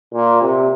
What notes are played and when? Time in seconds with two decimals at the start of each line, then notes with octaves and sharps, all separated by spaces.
0.13 A#2
0.42 C3